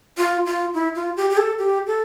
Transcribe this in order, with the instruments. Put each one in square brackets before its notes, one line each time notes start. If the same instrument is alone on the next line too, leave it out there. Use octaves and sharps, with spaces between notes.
[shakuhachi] F4
F4
E4
F4
G4
G4
A4
G4
A4